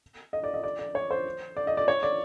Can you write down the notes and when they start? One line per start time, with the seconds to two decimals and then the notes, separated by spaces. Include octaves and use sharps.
0.33 D#5
0.44 D5
0.54 D#5
0.64 D5
0.79 D5
0.95 C#5
1.11 C5
1.57 D5
1.67 D#5
1.77 D5
1.88 C#5
2.03 D5